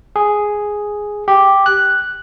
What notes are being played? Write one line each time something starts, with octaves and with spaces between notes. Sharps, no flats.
G#4
G4
F#6